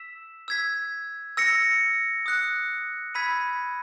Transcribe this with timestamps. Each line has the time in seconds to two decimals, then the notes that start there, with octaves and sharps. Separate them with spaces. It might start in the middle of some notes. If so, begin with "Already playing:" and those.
Already playing: E6 B6 E7
0.48 E6 G#6 B6
1.37 E6 A#6 C#7
2.26 D#6 F#6 C#7
3.14 B5 E6 G#6 B6 D#7